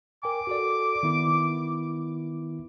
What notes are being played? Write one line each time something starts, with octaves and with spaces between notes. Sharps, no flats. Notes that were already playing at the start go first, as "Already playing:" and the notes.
A#4 G5 G#5 D6
F#4 A4 D5
D#3 B3 E4